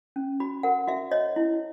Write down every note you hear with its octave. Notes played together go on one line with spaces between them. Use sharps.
C#4
F#4 B5
A#4 F#5
F#4 E5
C#5 D#5
E4